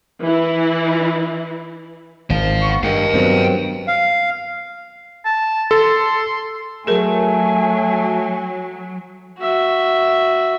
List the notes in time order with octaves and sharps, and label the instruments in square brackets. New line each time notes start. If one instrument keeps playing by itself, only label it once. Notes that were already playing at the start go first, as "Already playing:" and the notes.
[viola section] E3 E4
[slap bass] G#1 [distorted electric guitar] C5 F5
[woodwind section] B3 C#6
[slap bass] G2 [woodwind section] D#3 G#3 A#4 [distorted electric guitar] F5 G5
[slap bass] G2 [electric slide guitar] F#3 B3 C4
[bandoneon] F5
[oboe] A5
[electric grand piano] A4 [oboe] C6
[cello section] F#3 [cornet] A3 [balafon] G#4 A#4 [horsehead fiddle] G#5
[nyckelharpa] F#4 E5